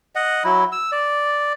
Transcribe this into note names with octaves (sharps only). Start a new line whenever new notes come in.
D#5 F#5
F#3 E4
E6
D5